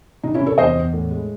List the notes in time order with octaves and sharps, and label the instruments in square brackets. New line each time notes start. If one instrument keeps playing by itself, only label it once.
[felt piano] C3 D#4
C#4 E4
C3
A4 C#5
E2 C5 D#5
E2
A2
G#3